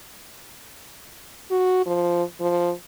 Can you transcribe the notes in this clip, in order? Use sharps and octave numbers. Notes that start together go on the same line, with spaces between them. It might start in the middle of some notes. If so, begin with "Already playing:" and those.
F#4
F3
F3